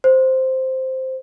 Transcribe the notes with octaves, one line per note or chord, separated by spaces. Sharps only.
C5